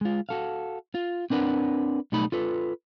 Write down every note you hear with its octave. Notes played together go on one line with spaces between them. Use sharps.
G#3 F4
F#4 A4 F5
F4
C4 D4 A#4 B4 F#5
B1 G3 A3 D#4 B5
F4 A4 B4